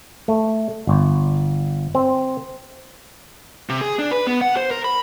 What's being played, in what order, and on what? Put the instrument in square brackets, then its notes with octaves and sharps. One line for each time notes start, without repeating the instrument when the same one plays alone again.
[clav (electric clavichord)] A3
G1
C4
[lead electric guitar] C3
G#4
D4
B4
B3
F#5
C5
A#4
B5